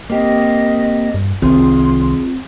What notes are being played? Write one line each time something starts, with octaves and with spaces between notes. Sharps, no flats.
A#3 C4 G4 D#5
G2
C2 D#3 C4 F4 G#4 C6